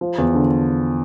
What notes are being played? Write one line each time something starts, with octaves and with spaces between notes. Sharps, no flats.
F3
E2
D3